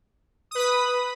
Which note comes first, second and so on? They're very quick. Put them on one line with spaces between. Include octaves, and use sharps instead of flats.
D#6 B4 B5